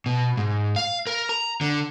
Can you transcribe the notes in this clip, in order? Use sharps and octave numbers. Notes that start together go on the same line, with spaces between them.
B2
G#2
F5
A#4
A#5
D3